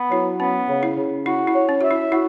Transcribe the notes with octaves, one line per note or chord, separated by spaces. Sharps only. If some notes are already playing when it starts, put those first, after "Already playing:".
Already playing: B3
F#3 E4
B3 C#4
C#3
E4
C#3
E4 F#4
E4
C#5
C#4
F#4 E5
E4
E4 F#4